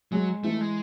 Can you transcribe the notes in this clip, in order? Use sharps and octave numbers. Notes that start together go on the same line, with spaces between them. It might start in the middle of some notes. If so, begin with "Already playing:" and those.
F#3 G#3
E3 A3
G#3